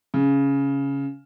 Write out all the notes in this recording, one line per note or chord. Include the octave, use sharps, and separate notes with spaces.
C#3